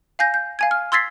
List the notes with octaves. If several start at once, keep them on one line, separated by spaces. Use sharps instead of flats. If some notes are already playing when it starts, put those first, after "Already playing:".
F5 G#5 G6 A#6
G6
F5 G#5 G#6
F6
C6 E6 G#6 A6 B6 C7